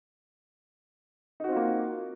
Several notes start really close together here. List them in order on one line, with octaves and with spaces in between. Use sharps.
D#4 F#4 C4 F4 A#3